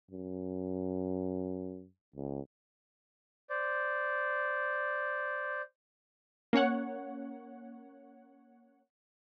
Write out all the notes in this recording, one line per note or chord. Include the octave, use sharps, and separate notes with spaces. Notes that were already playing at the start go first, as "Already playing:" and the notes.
F#2
C#2
C5 D5
A#3 C#4 C#5 F#5